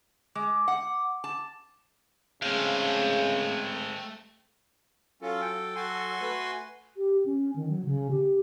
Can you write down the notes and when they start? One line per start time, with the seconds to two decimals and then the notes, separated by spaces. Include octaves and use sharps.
0.36 G#3 D6
0.68 F#5
1.24 A5
2.43 C#3 G#3 A3 C4 F5
5.22 F#3 C#4 F4 A4
5.41 G5
5.76 F#4 G#5 C6
6.21 A3 B4
6.97 G4
7.26 C#4
7.56 D#3
7.69 F#3
7.85 C#3
8.11 G4